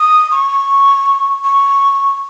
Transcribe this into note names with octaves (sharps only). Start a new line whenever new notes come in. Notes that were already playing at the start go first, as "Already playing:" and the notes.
Already playing: D#6
C#6
C#6